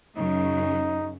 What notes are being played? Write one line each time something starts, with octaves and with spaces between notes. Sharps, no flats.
F#2 C#3 D#4